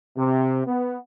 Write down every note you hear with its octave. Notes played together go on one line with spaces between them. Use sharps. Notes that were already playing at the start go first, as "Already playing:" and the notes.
C3
B3